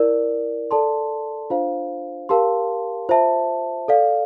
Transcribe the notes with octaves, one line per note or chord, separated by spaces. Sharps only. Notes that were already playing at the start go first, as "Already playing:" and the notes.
Already playing: E4 A#4 D5
A4 D5 A5 C6
D4 F4 C5 F5
G4 A#4 F5 A5 C6
F4 C5 E5 A5
A4 D5 F5